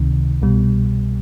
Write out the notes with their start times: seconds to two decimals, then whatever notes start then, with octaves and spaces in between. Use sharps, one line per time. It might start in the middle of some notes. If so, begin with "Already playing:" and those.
Already playing: C#2 C3 D#3
0.42 C2 B2 G3